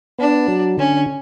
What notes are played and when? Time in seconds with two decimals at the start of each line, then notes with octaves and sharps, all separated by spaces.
0.19 B3 D4
0.48 F#3
0.78 D3 C#4